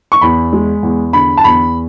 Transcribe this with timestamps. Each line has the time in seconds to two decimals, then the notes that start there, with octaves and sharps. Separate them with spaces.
0.12 C#6
0.21 E2 B5
0.53 G#3
0.83 E2
1.13 D3 B5
1.37 A5
1.44 E2 B5